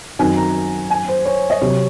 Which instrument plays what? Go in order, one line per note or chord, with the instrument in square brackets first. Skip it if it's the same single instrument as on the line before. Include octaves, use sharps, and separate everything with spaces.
[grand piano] F#2 D#3 F#3 C4 D#4 [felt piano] G#5
[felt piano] A#5
G#5
C5
C#5
D#5
[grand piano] C3 F#3 C4 [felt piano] C#5